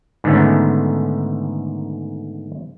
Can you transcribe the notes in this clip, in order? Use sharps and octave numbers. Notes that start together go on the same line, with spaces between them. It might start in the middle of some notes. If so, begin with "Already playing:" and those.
G#2 D3 D#3 A3 B3 C#4